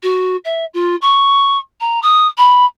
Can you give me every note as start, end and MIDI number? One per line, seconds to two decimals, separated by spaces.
0.02 0.36 66
0.44 0.65 76
0.73 0.95 65
1.01 1.57 85
1.80 2.00 82
2.02 2.27 87
2.37 2.65 83